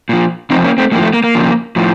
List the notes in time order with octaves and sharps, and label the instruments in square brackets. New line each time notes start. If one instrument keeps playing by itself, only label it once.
[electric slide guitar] A#2 F3
F2 C3 F3 C4 D#4
A#3 C#4
A3 C4
A2 F3 A#3
A3
A#3
A#3
F2 C#3 F3
A2 F3